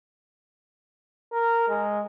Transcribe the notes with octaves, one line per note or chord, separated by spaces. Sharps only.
A#4
G#3